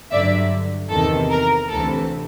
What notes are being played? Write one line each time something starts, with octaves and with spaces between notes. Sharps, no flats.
G2 D3 F#3 D5 E5
E2 C3 D#3 A4
A#4
D2 C3 E3 A4